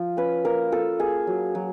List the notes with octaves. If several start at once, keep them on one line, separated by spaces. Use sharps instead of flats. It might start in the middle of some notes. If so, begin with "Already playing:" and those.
Already playing: F3 F4
C#4 B4
A#3 A#4
F4 A4
A#3 G#4
F#3
F#3